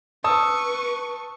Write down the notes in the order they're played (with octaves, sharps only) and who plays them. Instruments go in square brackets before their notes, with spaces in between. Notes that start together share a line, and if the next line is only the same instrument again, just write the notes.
[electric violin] B4 C#6 [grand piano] A5 D#6 E6